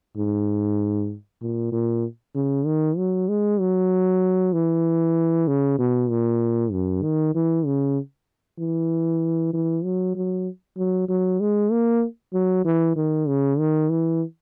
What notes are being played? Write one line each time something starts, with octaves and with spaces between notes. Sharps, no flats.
G#2
A#2
A#2
C#3
D#3
F#3
G#3
F#3
E3
C#3
B2
A#2
F#2
D#3
E3
C#3
E3
E3
F#3
F#3
F#3
F#3
G#3
A#3
F#3
E3
D#3
C#3
D#3
E3